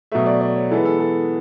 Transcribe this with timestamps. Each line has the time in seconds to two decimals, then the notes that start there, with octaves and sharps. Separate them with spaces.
0.12 B2 F#3 A3 E5
0.26 D5
0.41 D5
0.56 C#5
0.71 E3 G#3 B3 A4
0.85 A4
1.00 A4